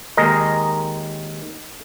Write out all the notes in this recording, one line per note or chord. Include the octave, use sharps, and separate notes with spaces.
D#2 D#3 G#3 A#4 D#5